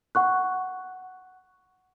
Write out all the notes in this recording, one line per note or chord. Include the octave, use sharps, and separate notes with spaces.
F#5 C#6 F#6